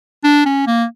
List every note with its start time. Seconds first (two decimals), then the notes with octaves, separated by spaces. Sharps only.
0.24 D4
0.46 C#4
0.67 A#3